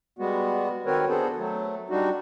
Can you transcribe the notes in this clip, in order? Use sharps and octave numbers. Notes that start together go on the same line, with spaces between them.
G3 G#3 B3 F#4
D#3 C4 F#4 A#4 B4 C#5
B3 D4 G#4 A4 C5
F#3 A3
G3 D4 D#4 F#4